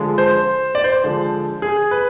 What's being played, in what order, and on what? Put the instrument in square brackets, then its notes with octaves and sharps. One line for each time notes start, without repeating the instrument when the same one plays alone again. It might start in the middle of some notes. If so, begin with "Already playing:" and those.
Already playing: [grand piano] D3 F3 G#3
C5
D5
C5
D3 F3 G#3
G#4
B4